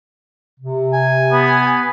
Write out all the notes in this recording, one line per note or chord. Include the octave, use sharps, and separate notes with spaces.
C3
G#5
B3